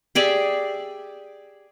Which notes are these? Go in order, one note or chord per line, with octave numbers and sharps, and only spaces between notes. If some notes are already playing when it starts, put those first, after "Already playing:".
G4 G#4 D5 E5